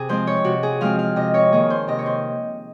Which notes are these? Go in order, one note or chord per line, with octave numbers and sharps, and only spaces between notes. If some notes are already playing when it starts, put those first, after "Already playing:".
Already playing: C3 G#4
F3 G#3 C4 C5
C#5
C3 F#4
G#4
F3 G#3 C4 F5
F5
C3 D#5
C#5
D#3 A#3 G#4
C5
C3 D#5
C#5
C5